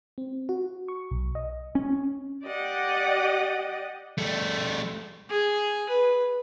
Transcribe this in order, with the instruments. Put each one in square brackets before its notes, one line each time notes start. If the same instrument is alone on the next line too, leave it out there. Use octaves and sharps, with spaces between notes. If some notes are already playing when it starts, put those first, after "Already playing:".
[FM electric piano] C4
F#4
C#6
B1
D#5
[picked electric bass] C#4
[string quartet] G4 D5 D#5 F#5
[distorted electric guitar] G3 A3
[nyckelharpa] G#4
B4